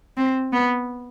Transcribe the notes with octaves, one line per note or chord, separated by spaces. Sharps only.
C4
B3